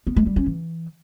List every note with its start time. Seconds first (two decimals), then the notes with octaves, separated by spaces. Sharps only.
0.07 B3
0.16 G#3
0.26 G3
0.36 C#4
0.46 E3